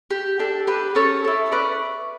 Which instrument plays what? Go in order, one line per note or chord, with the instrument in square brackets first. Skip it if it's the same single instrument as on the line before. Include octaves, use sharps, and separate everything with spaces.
[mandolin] G4
D4 A4
G4 B4
C#4 A4 C#5
E4 A4
C#4 B4 D5